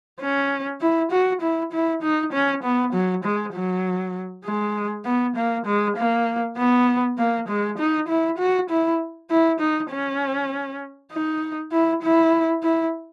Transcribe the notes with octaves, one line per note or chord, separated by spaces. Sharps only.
C#4
E4
F#4
E4
E4
D#4
C#4
B3
F#3
G#3
F#3
G#3
B3
A#3
G#3
A#3
B3
A#3
G#3
D#4
E4
F#4
E4
E4
D#4
C#4
D#4
E4
E4
E4